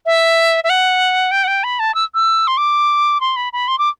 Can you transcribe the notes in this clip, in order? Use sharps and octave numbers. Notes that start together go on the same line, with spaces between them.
E5
E5
F#5
G5
F#5
G5
B5
A5
E6
E6
C6
D6
C6
B5
B5
C6
D6